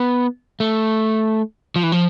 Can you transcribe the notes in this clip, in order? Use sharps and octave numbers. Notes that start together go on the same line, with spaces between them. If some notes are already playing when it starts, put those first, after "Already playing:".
Already playing: B3
A3
F3
E3
F3